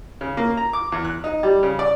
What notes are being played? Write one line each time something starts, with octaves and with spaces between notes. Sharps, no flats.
C#3
A#3
A#5
D6
E2
F#6
D#4
G3
C#3
D5